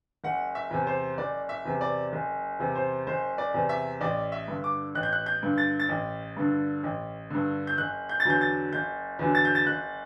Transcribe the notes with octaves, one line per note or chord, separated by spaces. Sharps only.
F#1 F#5
E5
E2 C3
C5
F#1 D5
E5
E2 C3
D5
F#1
E2 C3
C5
F#1 C5
D5
E2 C3
E5
A1 D5
E5
G2 D3
D6
A1 F#6
G6
F#6
G6
G2 D3
A6
A6
A1
G2 D3
A1
G2 D3
G6
F#1 F#6
G6
A6
E2 D3 F#3 G6
A6
F#1 G6
E2 D3 F#3
A6
G6
A6
F#1 F#6